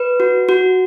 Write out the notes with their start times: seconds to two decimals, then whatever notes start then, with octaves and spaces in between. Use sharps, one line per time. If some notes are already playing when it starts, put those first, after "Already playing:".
Already playing: B4
0.20 F#4
0.49 F#4